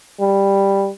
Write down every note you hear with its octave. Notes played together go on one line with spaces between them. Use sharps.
G3